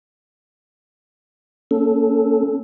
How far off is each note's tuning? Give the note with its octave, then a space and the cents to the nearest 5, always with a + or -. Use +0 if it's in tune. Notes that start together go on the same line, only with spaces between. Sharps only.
A#3 -10 C#4 +0 A4 -5